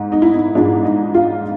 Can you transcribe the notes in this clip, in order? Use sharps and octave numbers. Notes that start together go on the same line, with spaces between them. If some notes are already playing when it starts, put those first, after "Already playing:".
Already playing: G#2
D#4
E4
D#4
G#2 F3 G#3 D4
D#4
F4